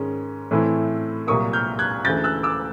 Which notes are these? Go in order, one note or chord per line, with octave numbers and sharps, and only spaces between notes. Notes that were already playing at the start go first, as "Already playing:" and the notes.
Already playing: G#2 D#3 G#3 C#4
A2 E3 A3 C4 E4
C2 A#2 F#3 A#3 C#6 D#6
F6 G6
F#6 G#6
D2 C#3 E3 A3 G6 A6
E6 F#6
D6 E6